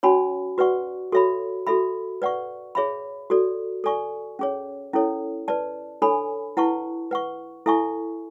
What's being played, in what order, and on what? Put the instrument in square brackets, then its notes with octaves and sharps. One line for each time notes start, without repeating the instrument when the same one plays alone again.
[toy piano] C#4 F#4 C#5 G#5 B5
F#4 B4 D5 F#5 C#6
F#4 A4 C#5 E5 B5
F#4 A4 E5 B5
B4 D5 F#5 C#6
G#4 C#5 E5 B5
F#4 A4 D5
A4 D5 G#5 C#6
C#4 G#4 C#5
C#4 E4 A4 C#5
B4 D5 A5
D4 A4 C#5 G#5 B5
E4 B4 F#5 A5 C#6
B4 F#5 C#6
E4 A4 E5 G#5 C#6